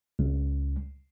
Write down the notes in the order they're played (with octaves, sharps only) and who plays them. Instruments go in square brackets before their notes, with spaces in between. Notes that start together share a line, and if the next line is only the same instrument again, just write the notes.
[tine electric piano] C#2